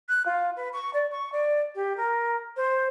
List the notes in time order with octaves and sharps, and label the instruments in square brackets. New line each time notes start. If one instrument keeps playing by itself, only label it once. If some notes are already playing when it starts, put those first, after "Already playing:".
[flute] F#6
F4
B4
C#6
D5
C#6
D5
G4
A#4
C5